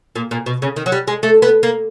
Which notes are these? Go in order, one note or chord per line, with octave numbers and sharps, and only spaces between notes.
A#2
A#2
B2
C#3
D#3
F#3
G3
G#3
A3
B3
A#3